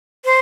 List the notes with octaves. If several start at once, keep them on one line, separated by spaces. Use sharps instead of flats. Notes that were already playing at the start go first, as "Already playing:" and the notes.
C5